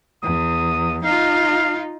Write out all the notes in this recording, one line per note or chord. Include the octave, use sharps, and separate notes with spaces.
E2 D#6
D#4 F4 F5